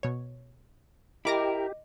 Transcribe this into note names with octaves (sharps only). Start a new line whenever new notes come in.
B2 C#5
E4 G4 A#4 D#5 B5 D6 A#6